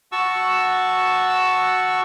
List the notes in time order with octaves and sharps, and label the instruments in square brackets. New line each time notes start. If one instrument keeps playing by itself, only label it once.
[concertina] F#4 A5 C#6 E6